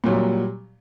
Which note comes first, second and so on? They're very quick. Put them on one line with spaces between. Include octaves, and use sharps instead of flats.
A#2 F#3 G3